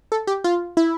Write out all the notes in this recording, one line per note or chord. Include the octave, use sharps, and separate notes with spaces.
A4
G4
F4
E4